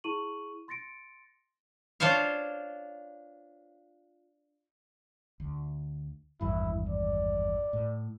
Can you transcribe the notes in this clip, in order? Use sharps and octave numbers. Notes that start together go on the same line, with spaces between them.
E4 G#4 C#6 D#7 F#7
C6 A6 A#6 C#7 D7
D4 F4 C5 C#5 F5
D2
G#1 E2 G2 E4
D5
A2